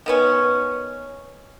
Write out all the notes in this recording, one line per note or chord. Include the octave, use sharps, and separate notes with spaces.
D#3 B3 C#4